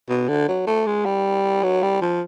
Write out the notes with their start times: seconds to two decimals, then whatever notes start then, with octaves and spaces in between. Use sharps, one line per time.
0.09 B2
0.29 D3
0.48 F#3
0.67 A3
0.87 G#3
1.05 G3
1.63 F#3
1.83 G3
2.02 F3